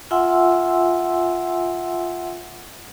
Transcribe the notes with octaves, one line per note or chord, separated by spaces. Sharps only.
F4 E5 F#5 G#5 C6 E6